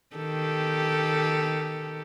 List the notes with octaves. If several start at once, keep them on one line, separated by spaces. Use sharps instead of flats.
D#3 G4 A4